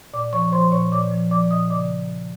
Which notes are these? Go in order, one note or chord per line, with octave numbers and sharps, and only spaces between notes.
A#2 D5 D6
F3 C#5 C#6
F3 C5 C6
A#2 C#5 C#6
A#2 D5 D6
F3
F3 D5 D6
A#2 D#5 D#6
C#3 D5 D6